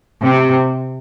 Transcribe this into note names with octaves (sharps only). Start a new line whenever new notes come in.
C3